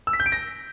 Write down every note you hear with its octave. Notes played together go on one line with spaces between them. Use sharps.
E6
B6
G6
D7
A#6